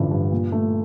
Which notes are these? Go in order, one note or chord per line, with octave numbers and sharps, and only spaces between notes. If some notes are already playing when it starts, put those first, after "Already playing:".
Already playing: A1 G2 D3 F3
G2
A#2
A3